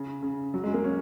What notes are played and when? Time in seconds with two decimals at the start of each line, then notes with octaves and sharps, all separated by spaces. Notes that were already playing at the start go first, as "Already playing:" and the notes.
Already playing: C#3
0.23 C#3
0.54 F#3
0.64 G#3
0.74 A#3
0.84 C#4